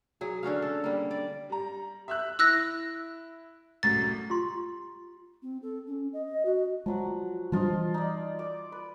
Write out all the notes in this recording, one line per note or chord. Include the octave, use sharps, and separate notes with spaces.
F#3 G#4
D3 C#4 F#4 F5
A4
G3 A#3
D5
G3 A#5
E5 E6 F#6
E4 E6 F#6 A#6
C2 F#2 A2 A6
F4 G4 C6
C4
A4
C#4
D#5
F#4
F3 F#3 G#3 F#5
E3 F3 G3 D4 F4 D#5
D#4 D5
D5 D6
B4